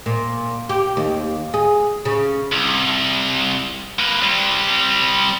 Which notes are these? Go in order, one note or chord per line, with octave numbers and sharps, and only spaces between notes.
A#2
G4
D#2
G#4
C#3
C2
A#3 B4
G3 C4